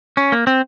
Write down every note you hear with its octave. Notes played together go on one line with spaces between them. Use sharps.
C#4
A#3
C4